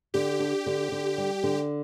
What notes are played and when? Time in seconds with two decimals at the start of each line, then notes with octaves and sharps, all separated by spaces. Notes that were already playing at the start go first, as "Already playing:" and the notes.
0.14 D3 G4
0.40 D4
0.66 D3
0.92 D3
1.18 G3
1.44 D3